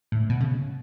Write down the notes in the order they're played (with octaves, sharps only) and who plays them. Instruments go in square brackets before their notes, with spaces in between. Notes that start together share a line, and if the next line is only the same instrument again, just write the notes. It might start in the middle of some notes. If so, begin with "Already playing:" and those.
[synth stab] A2
B2
C#3